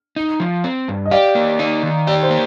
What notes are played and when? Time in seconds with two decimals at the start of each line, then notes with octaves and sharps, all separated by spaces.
0.16 D#4
0.40 F3
0.64 C4
0.88 G2
1.06 D#5
1.11 G4 D5 F5
1.35 A#3
1.59 D#4
1.83 D#3
2.07 G4 D5
2.23 C5
2.30 A#3